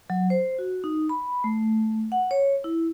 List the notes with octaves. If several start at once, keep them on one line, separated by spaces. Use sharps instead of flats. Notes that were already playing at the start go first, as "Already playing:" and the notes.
F#3
C5
F#4
D#4
B5
A3
F#5
C#5
E4